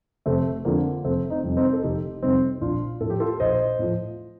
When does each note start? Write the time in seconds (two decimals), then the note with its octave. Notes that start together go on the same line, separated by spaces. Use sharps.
0.26 F1 A3 C4
0.65 F2 D3 F3 A#3
1.04 F1 A3 C4
1.30 C4 D#4
1.44 F2 C3 G3
1.57 C4 D#4
1.73 A4
1.83 F1 D#4 G4
2.22 F2 C3 G3 C4 D#4
2.61 A#1 D4 F4
3.01 A2 F3 A4
3.10 G4
3.20 F4 A4
3.40 A#1 C5 D#5
3.79 A2 F3